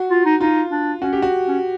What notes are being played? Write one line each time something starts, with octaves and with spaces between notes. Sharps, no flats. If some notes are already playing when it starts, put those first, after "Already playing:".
Already playing: F#4
F4
D#4
D#4 F4
D4
C#4 F#4
G4
F#4
C#4